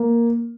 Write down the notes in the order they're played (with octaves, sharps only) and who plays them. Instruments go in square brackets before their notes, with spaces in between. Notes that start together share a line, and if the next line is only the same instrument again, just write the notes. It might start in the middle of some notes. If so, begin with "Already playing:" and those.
Already playing: [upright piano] A#3